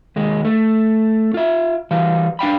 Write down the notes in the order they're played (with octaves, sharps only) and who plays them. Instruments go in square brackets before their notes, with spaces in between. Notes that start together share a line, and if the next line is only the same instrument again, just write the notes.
[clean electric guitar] D#2 G#3
A3
F4 E5
E3 G3 F5
D4 F5 G5 B5